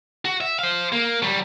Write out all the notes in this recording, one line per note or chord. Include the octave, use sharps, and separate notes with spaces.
F#4
E5
C5 F5
A#3
F#3 G3